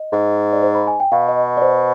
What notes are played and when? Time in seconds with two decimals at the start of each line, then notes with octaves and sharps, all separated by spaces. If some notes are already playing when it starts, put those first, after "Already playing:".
Already playing: D#5
0.12 G#2
0.53 D5
0.63 C5
0.75 B5
0.87 G#5
1.00 G5
1.12 B2 F5
1.29 D#5
1.57 D5
1.62 C5